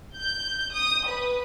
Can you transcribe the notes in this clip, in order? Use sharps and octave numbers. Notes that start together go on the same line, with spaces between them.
G6
D#6
B4